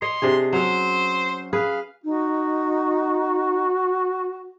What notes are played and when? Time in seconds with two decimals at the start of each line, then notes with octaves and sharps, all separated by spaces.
0.02 C#5 D#5 C6
0.22 C3 D4 G#4
0.53 F#3 C#4 C5
1.53 G#4 B4 F5
2.04 D#4 F#4